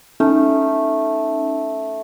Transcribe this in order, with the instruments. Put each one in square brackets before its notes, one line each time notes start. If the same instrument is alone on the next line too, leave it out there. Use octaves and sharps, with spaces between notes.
[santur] A3 [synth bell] C#4 D#4